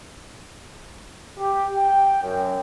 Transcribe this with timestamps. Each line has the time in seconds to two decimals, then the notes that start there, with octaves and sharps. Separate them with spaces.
1.38 G4
1.76 G5
2.22 F#2